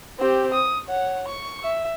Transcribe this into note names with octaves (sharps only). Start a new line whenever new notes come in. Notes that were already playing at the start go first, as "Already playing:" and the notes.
C4 G4
D#6
C#5 F#5
C#6
E5